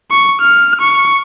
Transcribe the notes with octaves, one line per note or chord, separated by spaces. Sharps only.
C#6
F6
C#6